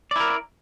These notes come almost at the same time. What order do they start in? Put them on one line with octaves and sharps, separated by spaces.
D5 E4 A#4